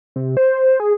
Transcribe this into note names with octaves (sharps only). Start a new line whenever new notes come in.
C3
C5
G#4